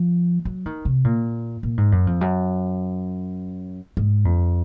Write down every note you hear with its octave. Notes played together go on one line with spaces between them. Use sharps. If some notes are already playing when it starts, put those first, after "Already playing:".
Already playing: F3
F#3
D#3
C3
A#2
A#2
G#2
F#2
F2
F#2
G#2
F2